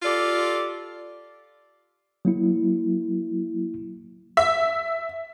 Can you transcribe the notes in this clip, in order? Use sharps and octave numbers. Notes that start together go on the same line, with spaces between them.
F4 G4 A4 D5
F#3 A#3 E4
E5